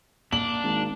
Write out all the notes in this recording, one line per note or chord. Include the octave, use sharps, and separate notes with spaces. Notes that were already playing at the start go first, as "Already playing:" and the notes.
A#3 D4 F#7
G#1